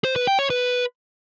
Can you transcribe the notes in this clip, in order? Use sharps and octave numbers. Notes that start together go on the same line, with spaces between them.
C5
B4
G5
C#5
B4